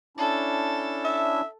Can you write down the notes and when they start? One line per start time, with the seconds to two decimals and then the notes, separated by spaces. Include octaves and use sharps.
0.17 C#4 D4 E4 A4
1.05 E5